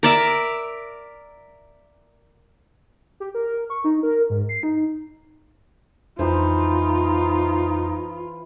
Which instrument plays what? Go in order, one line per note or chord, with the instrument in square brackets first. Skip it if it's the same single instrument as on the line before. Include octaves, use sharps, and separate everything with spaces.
[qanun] A#4 D5 E5
[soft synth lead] G4
A#4
C#6
D#4
A#4
G#2
C7
D#4
[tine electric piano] F2 [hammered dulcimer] E3 C5 [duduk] D#4 [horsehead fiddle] F4